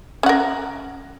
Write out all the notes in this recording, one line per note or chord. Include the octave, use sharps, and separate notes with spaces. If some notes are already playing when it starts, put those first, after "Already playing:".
C#4 A#4 F#5